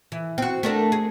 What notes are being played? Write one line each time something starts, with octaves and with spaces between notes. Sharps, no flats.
E3
C4 F#4
A3 D4 A#4
G#4